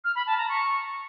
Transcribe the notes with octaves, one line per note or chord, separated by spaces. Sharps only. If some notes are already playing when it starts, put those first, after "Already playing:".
F6
B5
A5
A#5
C#6